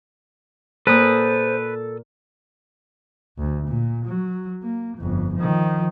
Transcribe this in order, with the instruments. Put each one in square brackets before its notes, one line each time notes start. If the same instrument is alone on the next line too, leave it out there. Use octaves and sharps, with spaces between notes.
[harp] A#2 A#3 [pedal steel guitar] A4 D#6 [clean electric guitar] B4 [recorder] C5
[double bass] D2
A#2
F#3
A#3
G1 F2
D#3 F3